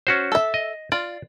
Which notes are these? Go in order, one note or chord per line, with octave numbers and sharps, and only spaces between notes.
C#4 F#4 C5
A4 E5
D#5
F4 D5